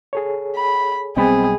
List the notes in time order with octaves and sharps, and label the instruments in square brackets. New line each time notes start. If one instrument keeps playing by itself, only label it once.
[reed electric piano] G#4 A4 C#5
[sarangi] B5
[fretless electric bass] B1 G3 B3 [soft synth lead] C4 [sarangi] G#4 [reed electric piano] D#5 G5 B5